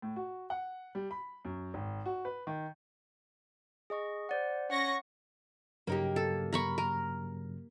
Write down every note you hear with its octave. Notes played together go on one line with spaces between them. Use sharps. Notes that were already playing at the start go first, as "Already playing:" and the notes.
A2
F#4
F#5
G3
B5
F#2
G#1
F#4
B4
D#3
G#4 D#5 C#6
C5 D5 F#5
C#4 F#5 C#6 A#6
G2 C#3 F#3 A#3 D#4 G4
A4
A#4 B5 C#6
A#4